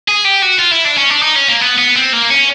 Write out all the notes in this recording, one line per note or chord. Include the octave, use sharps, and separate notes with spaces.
G#4
G4
F#4
F4
E4
D4
C#4
D4
D#4
C#4
A#3
B3
B3
C4
A#3
C#4